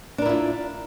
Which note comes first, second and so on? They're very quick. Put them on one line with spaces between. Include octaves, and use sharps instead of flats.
D4 A#4 E4 F4